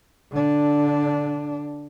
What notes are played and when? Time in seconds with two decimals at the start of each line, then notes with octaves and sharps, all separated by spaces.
0.32 D3 D4